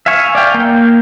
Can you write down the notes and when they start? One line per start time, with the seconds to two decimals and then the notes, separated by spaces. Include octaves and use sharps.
0.06 E5 F5 G#5 C#6
0.35 D5 F5 G5
0.54 A#3 G5